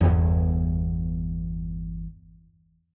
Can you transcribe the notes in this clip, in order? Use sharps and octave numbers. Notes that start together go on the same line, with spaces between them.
G1 E2